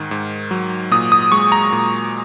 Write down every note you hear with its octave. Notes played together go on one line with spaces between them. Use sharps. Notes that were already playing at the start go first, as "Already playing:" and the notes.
Already playing: G#2 D#3
G#2
F#3
A#2 D#6
D#6
G#3 C#6
A#5
A#2